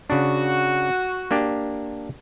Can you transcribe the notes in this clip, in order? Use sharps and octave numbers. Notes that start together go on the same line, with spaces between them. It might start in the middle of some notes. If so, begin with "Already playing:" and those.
C#3 D4 F#4
A#3 D4 G4